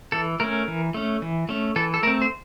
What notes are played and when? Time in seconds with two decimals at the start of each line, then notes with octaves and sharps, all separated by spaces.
0.12 E3 A4
0.40 A3 C#4 A#4
0.68 E3
0.94 A3 C#4
1.22 E3
1.49 A3 C#4
1.76 E3 A4
1.94 A4
2.03 A3 A#4
2.07 C4
2.22 C5